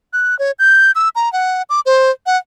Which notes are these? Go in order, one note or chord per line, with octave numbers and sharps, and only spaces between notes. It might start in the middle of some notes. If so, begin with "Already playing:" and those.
F#6
C#5
G6
E6
A#5
F#5
D6
C5
F#5